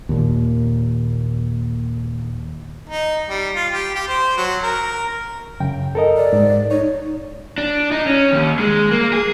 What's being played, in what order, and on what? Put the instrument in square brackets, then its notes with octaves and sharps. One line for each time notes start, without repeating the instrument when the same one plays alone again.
[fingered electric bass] D#2 A#2
[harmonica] D#4
G3
F4
G4
G4
C5
F#3
A#4
[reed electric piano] F#2 C#3 G5
A4 A#4 D#5
[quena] D5
[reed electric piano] G#2
[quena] D#4 [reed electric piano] C#5
[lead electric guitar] D4
D#4
C#4
D#2
G#3
A#3
G#4